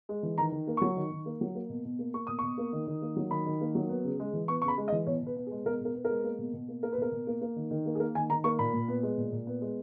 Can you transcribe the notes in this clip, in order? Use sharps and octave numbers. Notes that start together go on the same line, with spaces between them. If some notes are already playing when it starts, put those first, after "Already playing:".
G#3
E3
D#3 A#5
D#3
A#3
F#3 C#6
D#3
D#3
A#3
F#3
A#3
B2
B2
A#3
A#3 C#6
B2 D#6
B2 C#6
A#3
D#3
D#3
A#3
F#3
D#3 B5
D#3
A#3
F#3
B3
C#3
G#3
E3
B3 C#6
C#3 C#6
B5
G#3
D#5
E3
B2 C#5
B2 B4
B3
G#4
G#3
B2 A#4
B2 A#4
B3
G#3 A#4
A#3
B2
B2
A#3
A#3 A#4
B4
B2 A#4
B2
A#3
A#3
D#3
D#3
A#3
G#4
A#3 A#4
D#3 G#5
D#3 A#5
A#3 C#6
A#2 B5
A#2
B3
G#3
A#2
A#2
B3
G#3